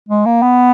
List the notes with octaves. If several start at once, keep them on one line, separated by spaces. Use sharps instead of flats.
G#3
A#3
B3